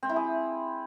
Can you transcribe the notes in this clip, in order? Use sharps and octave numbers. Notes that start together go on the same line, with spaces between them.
C4
E4
G#4